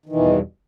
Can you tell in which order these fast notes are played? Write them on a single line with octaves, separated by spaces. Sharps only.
D#3 E3 B2 E2 G2